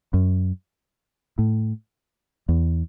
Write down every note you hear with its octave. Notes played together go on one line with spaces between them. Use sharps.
F#2
A2
E2